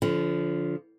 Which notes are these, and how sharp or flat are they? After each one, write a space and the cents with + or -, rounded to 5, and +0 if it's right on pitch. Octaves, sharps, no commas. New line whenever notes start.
D3 -25 F3 +0